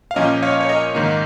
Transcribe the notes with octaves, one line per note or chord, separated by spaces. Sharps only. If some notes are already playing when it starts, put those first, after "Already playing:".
F5
A#2 F3 A#3 C#4 A#4 D#5
C#5 F5
C#5
A#4 D#5
G#2 D#3 A#3